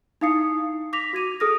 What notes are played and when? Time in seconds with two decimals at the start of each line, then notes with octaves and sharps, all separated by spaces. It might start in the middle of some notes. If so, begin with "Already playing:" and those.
0.21 D#4 E4 F5 D#6 C7 C#7
0.93 D6 A#6 B6 F7
1.13 F#4 G#6 D#7 F7
1.40 G#4 A4 D#6 F6 A#6